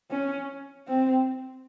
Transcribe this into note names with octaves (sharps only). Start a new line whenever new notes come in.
C#4
C4